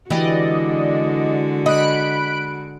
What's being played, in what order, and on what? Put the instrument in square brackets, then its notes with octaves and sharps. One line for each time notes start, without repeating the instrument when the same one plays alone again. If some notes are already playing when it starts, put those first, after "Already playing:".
[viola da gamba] D3 G#3 F#4 [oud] E3 G4 [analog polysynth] D5 D#5
[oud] D#5 [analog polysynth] B5 F#6 D7